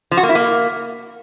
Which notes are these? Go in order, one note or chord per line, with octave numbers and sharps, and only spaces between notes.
F3
F#4
A#3
E4
A#3